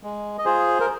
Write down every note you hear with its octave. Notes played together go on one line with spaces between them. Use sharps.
G#3
D#5
F4 G#4 C5
A#4